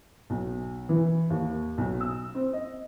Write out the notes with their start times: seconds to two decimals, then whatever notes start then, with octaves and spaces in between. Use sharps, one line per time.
0.30 B1
0.89 E3
1.30 D#2
1.78 B1
2.01 E6
2.35 C4
2.53 D#5